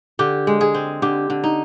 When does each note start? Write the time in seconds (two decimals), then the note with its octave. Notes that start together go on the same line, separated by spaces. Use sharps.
0.19 D3 G4
0.47 G#3
0.61 G#4
0.74 C4
1.02 D3 G4
1.30 D3
1.44 D#4